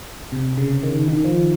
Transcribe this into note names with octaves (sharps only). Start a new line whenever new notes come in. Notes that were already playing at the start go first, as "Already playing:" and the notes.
C3
C#3
D#3
D#3
F3